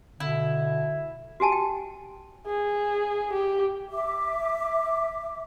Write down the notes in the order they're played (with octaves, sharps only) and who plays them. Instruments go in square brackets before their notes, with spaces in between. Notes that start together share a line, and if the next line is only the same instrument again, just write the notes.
[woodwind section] B2 D3 [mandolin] E4
[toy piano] F#4 G4 G#5 A5
G5
[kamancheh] G#4
G4
[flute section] E5 D6